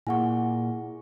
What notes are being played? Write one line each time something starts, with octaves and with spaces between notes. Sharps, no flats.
A#2 E4 G#4 F#5 G#5 C#6